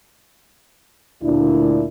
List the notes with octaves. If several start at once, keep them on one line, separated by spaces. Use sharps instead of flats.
D2 A#2 D4 E4